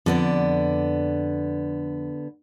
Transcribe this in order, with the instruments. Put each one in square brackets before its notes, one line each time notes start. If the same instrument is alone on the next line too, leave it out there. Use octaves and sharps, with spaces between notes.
[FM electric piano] F2 [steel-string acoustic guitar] D3 B3 D5